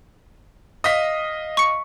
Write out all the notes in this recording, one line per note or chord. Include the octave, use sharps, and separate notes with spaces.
D#5 F5 B6
C#6 C#7